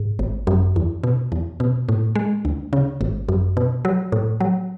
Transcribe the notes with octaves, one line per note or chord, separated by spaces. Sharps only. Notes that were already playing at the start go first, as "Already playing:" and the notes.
Already playing: G#2
G#1
F#2
E2
B2
E2
B2
A2
G#3
D2
C#3
G#1
F#2
B2
F#3
A2
F#3